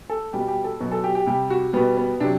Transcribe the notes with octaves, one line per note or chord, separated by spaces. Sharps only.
A4
B2 G3 G4
G4
A4
B2 F#3
A4
G4
G4
C3 G3 G4
F#4
B2 G3 B3
B3
C3 F#3 D4